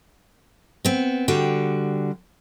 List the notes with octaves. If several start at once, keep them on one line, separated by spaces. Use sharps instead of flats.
B3 C4
D3 G3 F#4 G5